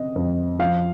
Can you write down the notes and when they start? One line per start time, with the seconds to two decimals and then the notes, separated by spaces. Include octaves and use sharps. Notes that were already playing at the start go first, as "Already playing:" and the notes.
Already playing: C4 D#5
0.16 F2
0.59 F3 F5